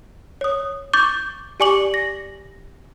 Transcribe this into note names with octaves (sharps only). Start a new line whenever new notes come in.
C#5 D#6
C#6 D6 G6 A6
G4 D5 G#5 C#6 D6 F#7
A#6